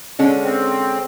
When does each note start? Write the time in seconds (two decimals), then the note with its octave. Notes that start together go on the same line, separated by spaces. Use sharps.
0.19 D3 G#3 C#4
0.43 C4